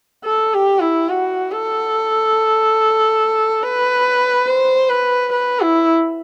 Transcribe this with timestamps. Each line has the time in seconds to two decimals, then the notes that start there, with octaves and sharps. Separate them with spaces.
0.25 A4
0.54 G4
0.81 E4
1.09 F#4
1.52 A4
3.64 B4
4.48 C5
4.90 B4
5.33 B4
5.61 E4